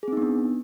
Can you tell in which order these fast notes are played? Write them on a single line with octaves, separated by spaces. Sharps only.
G#4 C4 D#4 B3 D4